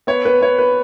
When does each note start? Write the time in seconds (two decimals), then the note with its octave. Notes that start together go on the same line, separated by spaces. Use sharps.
0.07 B3 C#5
0.25 B3 B4
0.41 B3 C#5
0.58 B4